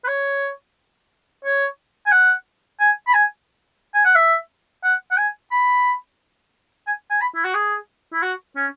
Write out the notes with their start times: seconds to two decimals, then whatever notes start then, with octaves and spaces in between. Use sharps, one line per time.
0.04 B4
0.08 C#5
1.45 C#5
2.06 G#5
2.12 F#5
2.80 G#5
3.07 B5
3.14 G#5
3.94 G#5
4.05 F#5
4.15 E5
4.84 F#5
5.11 F#5
5.17 G#5
5.51 B5
6.87 G#5
7.10 G#5
7.21 B5
7.35 E4
7.44 F#4
7.55 G#4
8.13 E4
8.22 F#4
8.56 C#4